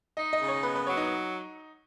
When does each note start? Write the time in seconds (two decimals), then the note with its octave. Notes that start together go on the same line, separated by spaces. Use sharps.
0.17 D#4 D#5
0.33 D#5
0.41 C#3
0.48 C#5
0.63 B3 B4
0.75 B4
0.86 F#3 C#5
0.97 D#4